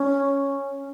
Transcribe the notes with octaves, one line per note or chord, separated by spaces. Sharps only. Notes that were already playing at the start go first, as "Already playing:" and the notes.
Already playing: C#4